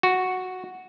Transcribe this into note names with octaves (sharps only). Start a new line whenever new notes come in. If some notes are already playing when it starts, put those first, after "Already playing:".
F#4